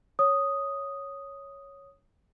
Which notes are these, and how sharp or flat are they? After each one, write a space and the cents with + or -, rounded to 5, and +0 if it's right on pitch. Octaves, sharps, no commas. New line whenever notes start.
C#5 +0 D#6 +0